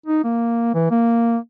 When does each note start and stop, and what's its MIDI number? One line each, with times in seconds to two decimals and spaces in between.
0.06 0.23 63
0.24 0.71 58
0.74 0.89 52
0.91 1.38 58